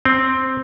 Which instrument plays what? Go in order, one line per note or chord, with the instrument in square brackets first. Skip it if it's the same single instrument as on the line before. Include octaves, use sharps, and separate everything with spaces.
[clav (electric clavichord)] C4